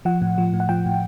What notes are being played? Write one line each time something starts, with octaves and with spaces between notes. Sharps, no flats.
F3 F#5
A2
F3
A2
F#5
F3 G5
A2